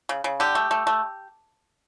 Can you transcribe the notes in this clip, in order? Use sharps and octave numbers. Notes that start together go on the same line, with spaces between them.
C#3
C#3
D3 G4
A3
A3
A3